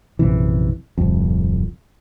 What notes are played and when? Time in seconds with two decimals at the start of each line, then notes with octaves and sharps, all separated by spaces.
0.19 A#1 F#2 C3 E3
0.98 D1 C2 F2